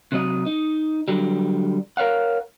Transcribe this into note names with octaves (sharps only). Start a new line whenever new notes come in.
C3 F#3 D#5
D#4
D3 F#3 G3
A#4 C#5 F5 F#5